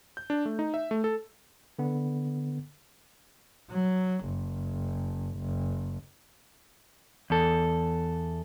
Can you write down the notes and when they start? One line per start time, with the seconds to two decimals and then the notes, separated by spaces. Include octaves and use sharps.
0.17 G6
0.30 D4
0.45 A3
0.59 D#4
0.74 E5
0.91 A3
1.04 A4
1.79 D3 B3
3.71 F#3
4.25 F#1
5.38 F#1
7.30 E2 A4